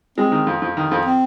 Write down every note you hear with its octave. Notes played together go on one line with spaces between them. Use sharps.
G#3 C4
D#3
F2
F2
D#3
F2
C4